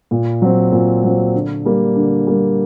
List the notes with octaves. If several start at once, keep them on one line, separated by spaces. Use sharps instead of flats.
A#2
F#3 C4
A#2
F#3 C4
D3
G3 A#3
D3
G3 A#3